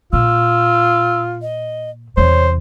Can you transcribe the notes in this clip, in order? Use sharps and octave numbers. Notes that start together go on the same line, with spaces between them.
A#2 F4 E6
D#5
E2 C3 C5 C#5